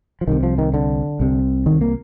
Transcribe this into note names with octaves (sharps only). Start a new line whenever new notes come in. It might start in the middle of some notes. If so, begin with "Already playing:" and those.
F3
C2 C3 D#3
F3
D#3
D3
C2 C3
D#3
A#3